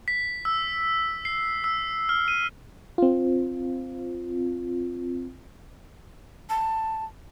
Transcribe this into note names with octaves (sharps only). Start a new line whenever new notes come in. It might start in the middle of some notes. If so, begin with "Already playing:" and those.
B6
E6
C7
E6
F6
D#7
C4 F4
A5